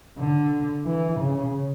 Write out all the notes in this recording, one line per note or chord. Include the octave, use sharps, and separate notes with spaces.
D3
E3
C#3